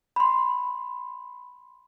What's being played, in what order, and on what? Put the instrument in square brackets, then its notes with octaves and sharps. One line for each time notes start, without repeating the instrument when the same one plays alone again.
[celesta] B5 C6